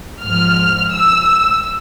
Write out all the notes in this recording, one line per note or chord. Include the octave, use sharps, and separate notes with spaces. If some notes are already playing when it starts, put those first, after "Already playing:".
G#2 F3 F6
E6